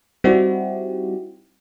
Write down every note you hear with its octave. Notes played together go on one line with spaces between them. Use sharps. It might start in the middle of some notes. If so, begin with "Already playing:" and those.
G3 C4 D#4 E4 F#4 G4